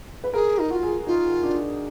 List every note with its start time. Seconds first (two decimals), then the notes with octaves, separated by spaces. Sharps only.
0.24 B4
0.34 G#4 A#4
0.58 D#4 A#4
0.70 F4 F#4
0.83 G#4
1.07 D#4 F4
1.43 D4